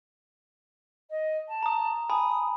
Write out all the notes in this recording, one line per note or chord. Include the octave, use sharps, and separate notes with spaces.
D#5
A5
A#5 D#6
G#5 A5 B5 D#6